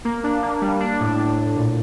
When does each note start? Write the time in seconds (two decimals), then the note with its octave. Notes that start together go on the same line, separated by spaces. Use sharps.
0.05 A#3
0.24 D4
0.43 A#3
0.62 G3
0.80 D4
1.00 A2
1.19 D4
1.38 A2
1.57 A#2